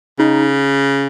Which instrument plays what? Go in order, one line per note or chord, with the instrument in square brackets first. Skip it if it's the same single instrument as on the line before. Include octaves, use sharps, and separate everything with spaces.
[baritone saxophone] C#3 [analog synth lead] D#4